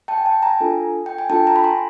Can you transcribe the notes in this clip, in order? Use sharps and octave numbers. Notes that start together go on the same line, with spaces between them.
G5 A5
G#5
G5 A5
G#5 A#5
D4 F4 A4
G5
G#5
D4 F4 A4 G5 A5
G#5 A#5
B5
A#5 C6